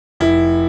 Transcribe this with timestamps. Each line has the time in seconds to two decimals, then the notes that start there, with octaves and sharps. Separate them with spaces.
0.20 F1 E4